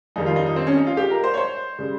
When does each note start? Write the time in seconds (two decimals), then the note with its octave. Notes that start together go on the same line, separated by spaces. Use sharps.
0.16 F2 D#3 G3 D#4
0.26 F4
0.36 D#4
0.46 D#4
0.56 C4
0.67 C#4
0.76 D#4
0.87 F4
0.97 G4
1.10 A#4
1.24 C5
1.34 C#5
1.37 C5
1.79 C#3 G3